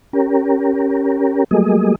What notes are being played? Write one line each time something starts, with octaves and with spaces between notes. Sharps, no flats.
C#4 G4 A#4
F#3 G3 A3 A#3 G#4 D#5